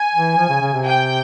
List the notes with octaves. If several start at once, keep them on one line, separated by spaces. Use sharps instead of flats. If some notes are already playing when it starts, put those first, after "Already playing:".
Already playing: G#5
E3
F3
C#3
C#3
C3
G5